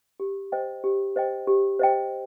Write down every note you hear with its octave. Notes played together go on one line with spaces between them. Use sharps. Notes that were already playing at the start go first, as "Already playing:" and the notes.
G4
C5 D#5 G5
G4
C5 D#5 G5
G4
C5 D#5 G5